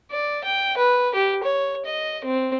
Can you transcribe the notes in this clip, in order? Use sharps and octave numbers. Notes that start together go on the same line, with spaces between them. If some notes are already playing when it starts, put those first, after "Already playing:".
D5
G5
B4
G4
C#5
D#5
C4